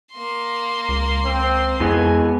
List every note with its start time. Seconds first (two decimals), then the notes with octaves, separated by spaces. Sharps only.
0.13 A#3 C6
0.89 C#2
1.25 C4
1.80 F2 E3 G#3 B3 G#5